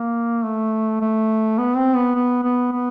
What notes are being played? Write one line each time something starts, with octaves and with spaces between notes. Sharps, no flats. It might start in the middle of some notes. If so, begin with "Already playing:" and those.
Already playing: A#3
A3
A3
B3
C4
B3
B3
B3
B3